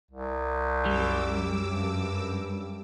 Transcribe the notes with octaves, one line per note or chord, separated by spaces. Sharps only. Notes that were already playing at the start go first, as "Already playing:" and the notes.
C2
F#2 G3 D6 E6
G2